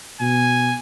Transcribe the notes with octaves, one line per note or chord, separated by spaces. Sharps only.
B2 G#5